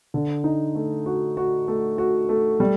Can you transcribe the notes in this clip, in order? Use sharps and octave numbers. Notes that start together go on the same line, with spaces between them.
D3
D#4
A3
F#4
F#4
A3
F#4
A3
G3